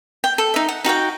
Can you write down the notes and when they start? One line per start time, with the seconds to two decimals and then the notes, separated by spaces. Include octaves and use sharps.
0.24 G5
0.38 A4
0.54 D#4 E5
0.69 F#5
0.84 D#4 F#4 F5 G5